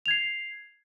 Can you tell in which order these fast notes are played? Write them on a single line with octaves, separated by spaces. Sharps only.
F7 G#6 C7